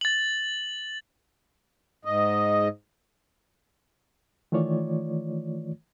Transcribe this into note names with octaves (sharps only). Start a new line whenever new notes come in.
A6 F#7
G#2 D#5
D#3 E3 A3 F4 C#5 D5